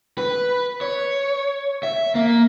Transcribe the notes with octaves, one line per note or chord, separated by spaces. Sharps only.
B4
C#5
E5
A#3